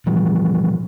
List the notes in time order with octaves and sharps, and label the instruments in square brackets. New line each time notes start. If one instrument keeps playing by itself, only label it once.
[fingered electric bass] A#2 E3 F3 G3